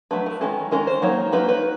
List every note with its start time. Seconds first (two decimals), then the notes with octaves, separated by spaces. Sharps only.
0.11 F#3 A3 D4 B4
0.26 A#4
0.41 D#3 G#3 C#4 A4
0.71 D#3 G#3 C#4 A#4
0.87 C5
1.02 F#3 A#3 D#4 C#5
1.32 F#3 A#3 D#4 B4
1.49 B4